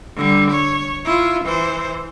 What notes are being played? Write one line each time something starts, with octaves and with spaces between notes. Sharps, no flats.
D3 G3
C#5
E4 F4
E3 C5